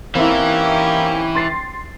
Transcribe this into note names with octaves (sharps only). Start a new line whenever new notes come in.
E3 A#3 C4 C#4 D#4 E4 G4
C6 A6 C7